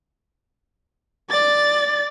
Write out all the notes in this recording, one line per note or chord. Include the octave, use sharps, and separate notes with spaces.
D5 A6